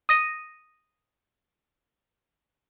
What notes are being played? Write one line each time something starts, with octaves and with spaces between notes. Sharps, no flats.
D#6 A#6 D#7